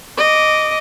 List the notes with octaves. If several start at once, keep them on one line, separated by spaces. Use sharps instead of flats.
D#5 D6